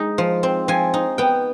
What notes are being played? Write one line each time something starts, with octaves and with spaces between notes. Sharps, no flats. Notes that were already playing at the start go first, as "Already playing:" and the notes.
Already playing: G#3 D#4
F3
C4
F3 G#5
D#4
B3 G5